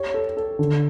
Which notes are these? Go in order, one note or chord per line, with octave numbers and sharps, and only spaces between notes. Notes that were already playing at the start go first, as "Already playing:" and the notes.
Already playing: G4 C#5
A4
A4
D3